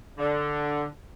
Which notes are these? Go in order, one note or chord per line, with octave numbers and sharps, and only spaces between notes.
D3